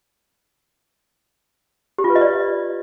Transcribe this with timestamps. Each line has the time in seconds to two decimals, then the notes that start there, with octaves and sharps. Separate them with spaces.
1.98 G4
2.04 F4
2.10 B4
2.16 D#5
2.21 D5